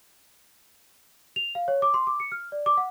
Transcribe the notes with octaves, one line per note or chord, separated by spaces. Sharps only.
F7
F5
C#5
D6
C6
D6
C#7
F6
D5
D6
F#5